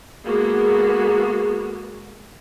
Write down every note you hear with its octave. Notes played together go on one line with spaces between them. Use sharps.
G#3 A#3 B3 F#4 G#4 A4